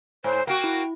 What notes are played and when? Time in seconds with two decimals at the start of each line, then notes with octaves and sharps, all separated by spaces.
0.24 G#2 C5
0.47 A#3 F#4 G5
0.64 E4